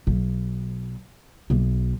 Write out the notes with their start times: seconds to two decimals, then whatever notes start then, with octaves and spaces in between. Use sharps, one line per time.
0.07 B1
1.50 B1 B2